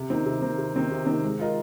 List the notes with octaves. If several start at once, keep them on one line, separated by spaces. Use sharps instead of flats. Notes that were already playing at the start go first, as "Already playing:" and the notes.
Already playing: C3
D#3 C4 D#4
C3
D#3 C4 D#4
C3
D#3 C4 D#4
C3
D#3 C4 D#4
G#3
F4 A#4 D#5